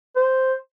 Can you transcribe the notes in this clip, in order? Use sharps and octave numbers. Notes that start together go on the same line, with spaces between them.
C5